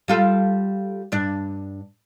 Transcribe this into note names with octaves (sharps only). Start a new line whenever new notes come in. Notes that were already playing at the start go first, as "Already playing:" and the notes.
G3 F4 A4
G2 D4